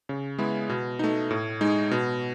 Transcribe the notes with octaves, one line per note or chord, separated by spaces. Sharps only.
C#3
G#3 B3 E4
B2
A3 D#4
A2
G#3 D#4
B2